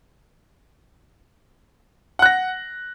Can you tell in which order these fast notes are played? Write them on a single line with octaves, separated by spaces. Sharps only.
F#5 F#6 A#6